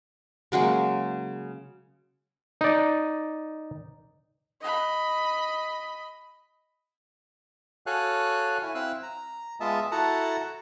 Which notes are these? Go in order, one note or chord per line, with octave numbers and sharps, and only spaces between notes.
C#3 F#3 G#3 A#3
D#4 D5
D#5 B5
F#4 A4 C#5 F5 G#5 F#6
E4 G#5
C4 E4 F5 E6 F#6
A#5
G#3 B3 F4 D#5 E5 A5
E4 F#4 A4 F#5 A5 A#5